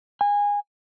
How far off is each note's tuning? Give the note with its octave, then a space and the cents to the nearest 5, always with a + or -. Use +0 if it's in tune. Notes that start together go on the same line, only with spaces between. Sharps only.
G#5 -20